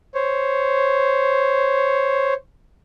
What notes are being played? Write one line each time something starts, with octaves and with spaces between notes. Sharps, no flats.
C5 C#5